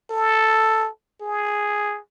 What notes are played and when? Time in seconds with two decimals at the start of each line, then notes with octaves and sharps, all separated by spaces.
0.11 A4
1.21 G#4